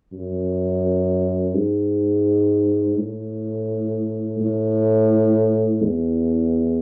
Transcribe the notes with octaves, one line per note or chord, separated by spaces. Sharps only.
F#2
G#2
A2
A2
E2